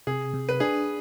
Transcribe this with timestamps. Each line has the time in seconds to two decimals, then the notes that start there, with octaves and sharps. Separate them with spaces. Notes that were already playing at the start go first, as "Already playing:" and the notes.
0.07 C3 G#4
0.34 C3
0.49 B4
0.60 D4 G#4